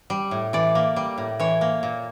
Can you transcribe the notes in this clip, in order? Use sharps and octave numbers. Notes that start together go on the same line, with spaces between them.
G3
A2
E3 D5
A#3
G3
A2
E3 C#5
A#3
A#2